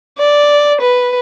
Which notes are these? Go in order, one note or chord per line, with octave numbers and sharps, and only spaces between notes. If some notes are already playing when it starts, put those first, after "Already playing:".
D5
B4